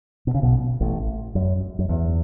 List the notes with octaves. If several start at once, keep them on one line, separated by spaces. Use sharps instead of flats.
B2
C#3
B1 B2
A1 A2
F#2
F#2
E2